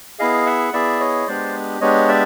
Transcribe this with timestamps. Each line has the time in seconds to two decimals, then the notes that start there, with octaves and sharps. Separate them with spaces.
0.19 B3 E4 G#4 D#5 F5
0.46 E5 F#5
0.73 B3 E4 G#4 D5 E5
1.00 C#5 D#5
1.27 G#3 B3 D4 G4 C5 D5
1.81 G#3 B3 D4 G4 C#5 D#5
2.08 D5 E5